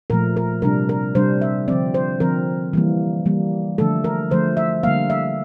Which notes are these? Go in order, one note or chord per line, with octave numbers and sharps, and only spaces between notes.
A#2 F3 A3 A#4
A#4
C3 G3 D4 A#4
A#4
C3 G3 D4 C5
E5
D3 F3 C4 D5
C5
D3 F3 C4 A#4
E3 G3 A#3
E3 G3 A#3
D3 F3 A3 A4
A#4
D3 F3 A3 C5
E5
D3 G3 A#3 F5
E5